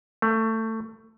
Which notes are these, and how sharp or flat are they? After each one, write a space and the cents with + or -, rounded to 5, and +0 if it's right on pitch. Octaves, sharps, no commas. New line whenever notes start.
A3 +20